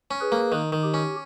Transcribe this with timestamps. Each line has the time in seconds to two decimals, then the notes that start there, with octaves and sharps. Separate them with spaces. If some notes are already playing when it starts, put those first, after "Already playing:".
0.11 C#4
0.20 G#4 B4
0.32 A#3
0.52 D#3
0.72 D#3
0.83 G4
0.94 C#4